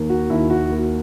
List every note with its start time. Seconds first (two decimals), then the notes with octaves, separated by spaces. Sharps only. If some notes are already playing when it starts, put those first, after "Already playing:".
Already playing: D#2 A#3
0.09 F#4
0.30 D#2 E4
0.50 F#4
0.70 A#3